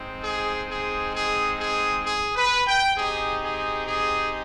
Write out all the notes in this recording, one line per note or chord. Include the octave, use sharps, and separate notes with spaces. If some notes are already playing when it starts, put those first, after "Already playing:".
Already playing: G#3 C4 D#4
G#4
G#4
G#4
G#4
G#4
B4
G5
C4 D#4 G4 G#4
G#4
G#4